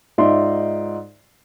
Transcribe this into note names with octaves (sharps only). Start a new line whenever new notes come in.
G#2 D#4 F4 D5 E5 C6